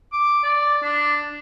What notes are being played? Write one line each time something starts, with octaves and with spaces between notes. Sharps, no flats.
D6
D5
D4